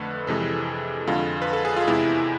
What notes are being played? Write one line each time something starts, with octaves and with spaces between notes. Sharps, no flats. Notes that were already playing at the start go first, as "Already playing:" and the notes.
Already playing: F2 D3 A3 B4
F2 C3 E3 G#3 A4
F2 D3 G#3 F4
B4
A4
G#4
F4
E2 C3 E3 G#3 E4